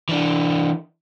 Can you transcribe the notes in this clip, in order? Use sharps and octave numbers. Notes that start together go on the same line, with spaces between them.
E3 D4